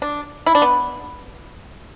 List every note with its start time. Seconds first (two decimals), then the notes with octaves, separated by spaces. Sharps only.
0.02 D4
0.46 E4
0.55 D4
0.62 B3